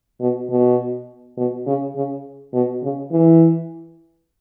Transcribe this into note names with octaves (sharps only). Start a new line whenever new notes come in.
B2
B2
B2
C#3
C#3
B2
C#3
E3